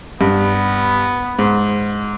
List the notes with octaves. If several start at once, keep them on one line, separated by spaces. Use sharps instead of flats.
G2 B3
G#2